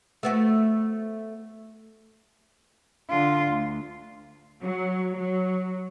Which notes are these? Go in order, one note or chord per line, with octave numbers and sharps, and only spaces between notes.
A3 B3 F#4
D3 F4
D2
F#3
F#3